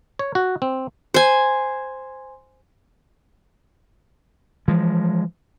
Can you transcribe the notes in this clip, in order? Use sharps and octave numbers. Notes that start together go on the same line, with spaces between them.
C#5
F#4
C4
C5 G#5
E3 F3 G#3